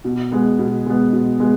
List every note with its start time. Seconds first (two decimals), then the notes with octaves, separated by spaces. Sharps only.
0.04 B2
0.32 G#3 B3
0.59 B2
0.86 G#3 B3
1.13 B2
1.40 G#3 B3